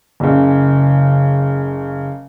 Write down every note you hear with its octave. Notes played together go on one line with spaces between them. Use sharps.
F#1 C#3